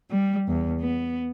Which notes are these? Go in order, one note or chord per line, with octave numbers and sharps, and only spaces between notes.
G3
E2
B3